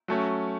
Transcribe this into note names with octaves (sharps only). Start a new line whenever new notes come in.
F#3 A3 C#4